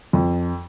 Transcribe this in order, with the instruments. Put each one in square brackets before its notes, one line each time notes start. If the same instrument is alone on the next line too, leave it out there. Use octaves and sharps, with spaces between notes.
[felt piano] F2